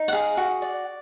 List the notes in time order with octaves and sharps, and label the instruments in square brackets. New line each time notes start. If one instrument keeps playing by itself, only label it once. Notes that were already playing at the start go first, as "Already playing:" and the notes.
Already playing: [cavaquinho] D#4
F#5
G#4 F5
F#4
D5